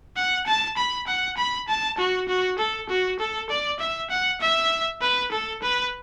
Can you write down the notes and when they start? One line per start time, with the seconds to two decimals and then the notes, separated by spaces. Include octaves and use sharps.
0.16 F#5
0.47 A5
0.77 B5
1.07 F#5
1.37 B5
1.68 A5
1.98 F#4
2.28 F#4
2.59 A4
2.89 F#4
3.20 A4
3.49 D5
3.80 E5
4.10 F#5
4.41 E5
5.02 B4
5.31 A4
5.62 B4